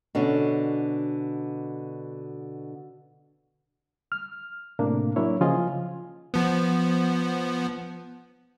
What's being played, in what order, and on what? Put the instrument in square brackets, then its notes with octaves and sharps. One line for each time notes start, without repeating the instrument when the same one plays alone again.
[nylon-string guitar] B2 D3 C#4 D4
[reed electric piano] F6
A2 C3 A#3 D4
F#3 A#3 D4 E4 C#5
C#3 F3 F4 D#5 F5 G#5
[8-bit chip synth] F3 B3